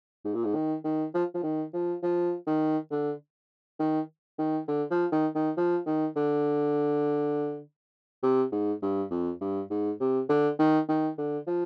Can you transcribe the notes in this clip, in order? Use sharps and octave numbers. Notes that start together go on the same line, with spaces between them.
G#2
A#2
G#2
D#3
D#3
F3
F3
D#3
F3
F3
D#3
D3
D#3
D#3
D3
F3
D#3
D#3
F3
D#3
D3
C3
G#2
G2
F2
G2
G#2
C3
D3
D#3
D#3
D3
F3